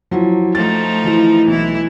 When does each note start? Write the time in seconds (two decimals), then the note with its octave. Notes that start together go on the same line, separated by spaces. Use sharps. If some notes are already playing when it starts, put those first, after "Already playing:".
0.11 F3 F#3 E4
0.55 F3 A3 D#4 A6
1.04 E3 E4
1.48 B1 E3 E4